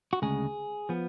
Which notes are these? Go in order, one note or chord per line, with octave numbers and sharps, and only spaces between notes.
F#4
D2 C#3 G#3 G#4
F3 B3